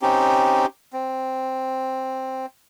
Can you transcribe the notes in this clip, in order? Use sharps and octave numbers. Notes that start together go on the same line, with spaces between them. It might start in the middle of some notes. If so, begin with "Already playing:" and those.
C4 C#4 D#4 G4
C4